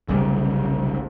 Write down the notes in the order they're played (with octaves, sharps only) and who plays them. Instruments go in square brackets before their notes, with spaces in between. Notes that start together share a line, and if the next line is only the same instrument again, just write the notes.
[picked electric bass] F1 B1 C#3 G3